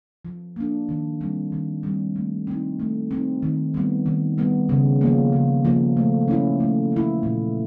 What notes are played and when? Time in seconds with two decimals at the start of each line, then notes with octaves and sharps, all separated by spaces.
0.25 F3
0.56 A#3 D4
0.89 D#3
1.21 G3 C4
1.52 D#3
1.83 G3 C4
2.16 A3
2.47 C4 D#4
2.79 A3
3.11 C4 D#4
3.42 D#3
3.74 G3 B3
4.06 D#3
4.38 G3 B3
4.69 C#3
5.01 F3 A#3
5.33 C#3
5.65 F3 A#3
5.97 A3
6.28 C#4 E4
6.60 A3
6.92 C#4 E4
7.23 A#2